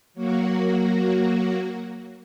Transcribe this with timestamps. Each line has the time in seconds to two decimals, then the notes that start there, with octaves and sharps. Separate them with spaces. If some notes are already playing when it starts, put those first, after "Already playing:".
0.14 F#3 A#3 F#4